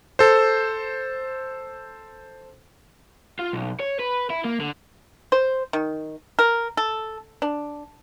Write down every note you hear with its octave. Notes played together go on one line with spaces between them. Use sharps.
A4 C5
F4
B1
C#5
B4
E4
A#3
D3
C5
D#3
A#4
A4
D4